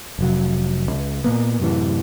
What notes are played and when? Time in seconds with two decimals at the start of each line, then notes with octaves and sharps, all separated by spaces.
0.19 F1 F#3
0.89 C#2
1.24 A#2 A#3 B3
1.60 F#2 A2 C3 E3